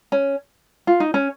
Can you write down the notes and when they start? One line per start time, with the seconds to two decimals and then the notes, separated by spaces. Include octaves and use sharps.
0.12 C#4
0.87 F4
1.00 D#4
1.14 C#4